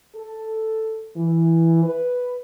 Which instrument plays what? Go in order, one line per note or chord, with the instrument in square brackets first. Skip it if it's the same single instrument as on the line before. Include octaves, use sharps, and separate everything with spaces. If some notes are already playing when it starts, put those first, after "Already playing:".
[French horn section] A4
E3
B4